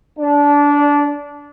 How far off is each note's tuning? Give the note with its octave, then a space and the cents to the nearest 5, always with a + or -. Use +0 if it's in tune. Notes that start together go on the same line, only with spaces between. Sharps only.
D4 -20